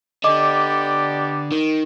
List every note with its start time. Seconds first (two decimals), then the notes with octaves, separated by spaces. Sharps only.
0.24 D3 B3 G4 D5 D#5 D6
1.52 D#3